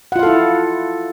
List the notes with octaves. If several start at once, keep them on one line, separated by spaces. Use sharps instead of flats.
E4 F4 A4 F5 F#5